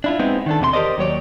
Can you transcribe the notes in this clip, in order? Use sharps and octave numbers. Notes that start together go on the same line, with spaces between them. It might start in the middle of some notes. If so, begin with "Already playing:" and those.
D4 E4 F4
G#3 B3 C4 D#4 E4
D#3 D4 A4
E2 C3 F4 C6
G4 G#4 A#4 C5 D5 D#5
D#2 F#3 C#5 D5